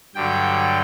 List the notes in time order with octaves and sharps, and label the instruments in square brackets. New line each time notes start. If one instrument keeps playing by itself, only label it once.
[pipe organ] G2 D3 F#3 G5